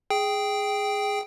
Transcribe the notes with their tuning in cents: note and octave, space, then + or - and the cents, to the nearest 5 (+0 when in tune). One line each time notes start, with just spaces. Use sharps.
G#4 +0 G5 +0